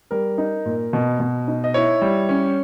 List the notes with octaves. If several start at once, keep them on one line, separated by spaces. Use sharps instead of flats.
G3 A#4
D#4
A#2
B2
B2
D#4
D#5
E4 C#5
G3
C#4